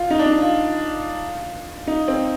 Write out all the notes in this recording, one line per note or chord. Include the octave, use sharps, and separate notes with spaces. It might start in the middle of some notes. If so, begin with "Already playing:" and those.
Already playing: F4
D#4
D4
D#4
F4
D#4
C4